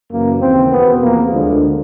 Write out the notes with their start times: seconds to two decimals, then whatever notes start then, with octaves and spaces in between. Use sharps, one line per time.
0.11 F#2 C#3 E3 A#3
0.41 D#2 C#3 E3 C4
0.71 E2 B2 B3
1.01 E2 C3 F3 A#3
1.32 D2 D3 F3 G#3